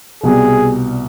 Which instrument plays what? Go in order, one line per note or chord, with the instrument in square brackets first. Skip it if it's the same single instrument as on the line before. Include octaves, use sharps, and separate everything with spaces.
[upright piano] C2 B2 G3 [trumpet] G#4